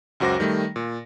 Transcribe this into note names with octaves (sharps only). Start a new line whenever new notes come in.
C#2 F#2 F#4 C5 D6 A#6
D#3 G3 A3
A#2